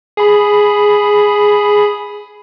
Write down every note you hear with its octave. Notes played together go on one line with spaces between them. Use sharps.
G#4 B5